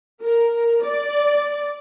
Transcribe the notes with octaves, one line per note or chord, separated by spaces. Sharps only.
A#4
D5